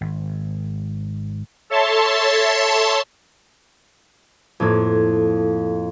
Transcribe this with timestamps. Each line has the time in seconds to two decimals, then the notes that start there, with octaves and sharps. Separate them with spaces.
0.01 G#1
1.70 A4 C#5 E5 A5 C6
4.60 F2 A2 A#3 G#6